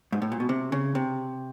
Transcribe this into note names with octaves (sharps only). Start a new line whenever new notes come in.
G#2
A2
A#2
B2
C3
C#3
C3